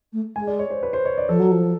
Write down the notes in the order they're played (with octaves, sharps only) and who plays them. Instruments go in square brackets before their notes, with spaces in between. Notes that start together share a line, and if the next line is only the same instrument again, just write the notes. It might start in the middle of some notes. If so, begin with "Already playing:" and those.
[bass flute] A3
[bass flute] G#3 [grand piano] G#5
[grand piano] D5
C#5
C5
B4
C5
C#5
D5
[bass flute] F3 [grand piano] A4
[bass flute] F#3
F3